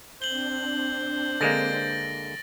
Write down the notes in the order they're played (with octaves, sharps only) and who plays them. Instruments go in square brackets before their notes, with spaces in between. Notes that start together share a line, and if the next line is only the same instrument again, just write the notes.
[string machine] C4 D4 [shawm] C5 [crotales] F#7 G7
[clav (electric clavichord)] D3 G#3 A#3 [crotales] A6 A#6 D7